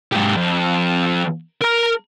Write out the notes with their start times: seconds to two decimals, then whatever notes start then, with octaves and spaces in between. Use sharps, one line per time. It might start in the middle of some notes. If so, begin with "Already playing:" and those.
0.12 G#2 G4
0.36 F2
1.62 A#4 A#5